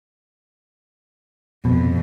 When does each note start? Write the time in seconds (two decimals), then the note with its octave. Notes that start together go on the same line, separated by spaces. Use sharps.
1.65 F2 B2